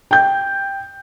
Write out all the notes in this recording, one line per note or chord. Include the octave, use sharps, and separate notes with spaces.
G5 G6